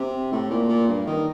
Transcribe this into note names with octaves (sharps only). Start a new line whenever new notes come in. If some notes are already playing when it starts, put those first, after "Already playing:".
Already playing: C3
A2
A#2
A#2
G2
D#3